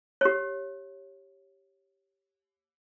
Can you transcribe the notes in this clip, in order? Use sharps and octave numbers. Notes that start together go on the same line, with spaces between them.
G4 C#5